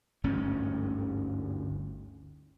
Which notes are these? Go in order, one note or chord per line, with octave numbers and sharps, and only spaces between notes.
G1 D2 G#2 C#4